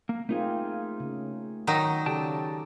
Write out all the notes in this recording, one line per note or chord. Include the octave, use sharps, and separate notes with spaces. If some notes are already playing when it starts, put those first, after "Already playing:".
A#3
A3 A#3 C4 D#4 F4 G#4
C#3
D#3 F#3 D#4
C#3 G4 A4 D5 G5 A5